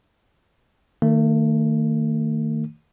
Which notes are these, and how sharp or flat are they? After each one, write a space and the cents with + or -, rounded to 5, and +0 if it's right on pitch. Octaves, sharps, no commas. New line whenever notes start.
D#3 +0 A3 +40